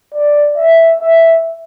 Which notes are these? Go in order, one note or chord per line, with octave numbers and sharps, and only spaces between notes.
D5
E5
E5